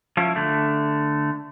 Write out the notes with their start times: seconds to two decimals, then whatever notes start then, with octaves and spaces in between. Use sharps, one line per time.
0.17 F3 C#4 E4
0.36 D3 A3